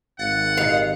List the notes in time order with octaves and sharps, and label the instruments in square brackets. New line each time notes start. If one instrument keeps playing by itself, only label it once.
[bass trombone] G#1 [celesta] F5 A6 [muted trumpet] F#5
[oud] D#3 F5 [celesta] G4 A#4 D#5